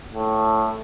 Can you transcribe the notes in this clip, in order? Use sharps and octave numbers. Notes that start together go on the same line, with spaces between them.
A2